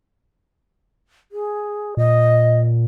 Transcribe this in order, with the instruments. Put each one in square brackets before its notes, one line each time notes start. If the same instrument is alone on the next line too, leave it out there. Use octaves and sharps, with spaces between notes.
[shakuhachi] G#4
[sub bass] A#2 [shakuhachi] D#5